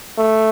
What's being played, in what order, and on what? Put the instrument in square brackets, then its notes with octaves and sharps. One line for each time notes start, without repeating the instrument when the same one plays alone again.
[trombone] A3